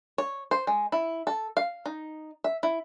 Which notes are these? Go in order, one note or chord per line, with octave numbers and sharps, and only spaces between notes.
C#5
C5
G#3
E4
A4
F5
D#4
E5
E4